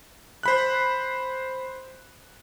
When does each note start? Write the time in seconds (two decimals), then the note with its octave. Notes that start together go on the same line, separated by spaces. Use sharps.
0.43 C5 B5 F#6